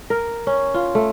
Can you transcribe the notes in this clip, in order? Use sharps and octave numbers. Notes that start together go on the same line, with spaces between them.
A#4
C#4
F4
A3